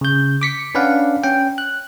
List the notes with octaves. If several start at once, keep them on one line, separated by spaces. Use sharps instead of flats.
C#3 G6
D6 B6 C#7
C#4 D4 B4 D5 F5 F#5
C#4 G5
F#6